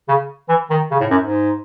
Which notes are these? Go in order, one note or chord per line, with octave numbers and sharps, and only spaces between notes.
C#3
E3
D#3
C#3
A2
F#2
G#2